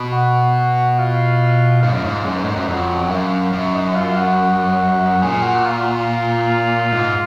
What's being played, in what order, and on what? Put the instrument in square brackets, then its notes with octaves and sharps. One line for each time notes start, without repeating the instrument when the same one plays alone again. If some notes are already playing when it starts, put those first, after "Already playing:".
Already playing: [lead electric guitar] B2
[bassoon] F#4
F4
[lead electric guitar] G#2 [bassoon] F4
[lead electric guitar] F#2
G#2
[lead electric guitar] F#2 [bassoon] G#3
[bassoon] B2
[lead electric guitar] G#2 [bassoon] D3
[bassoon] D#3
[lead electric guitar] F#2 [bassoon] F3
[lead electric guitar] F2 [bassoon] F#3
[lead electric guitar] F#2 [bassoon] A#3
[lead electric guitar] F#2
[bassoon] D#4
F4
F#4
[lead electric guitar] A#2 [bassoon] G#4
[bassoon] F#4
F4
F#4
F4
[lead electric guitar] G#2